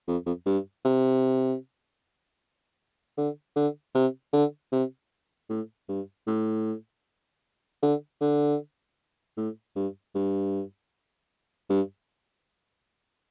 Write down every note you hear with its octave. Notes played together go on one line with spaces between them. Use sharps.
F2
F2
G2
C3
D3
D3
C3
D3
C3
A2
G2
A2
D3
D3
A2
G2
G2
G2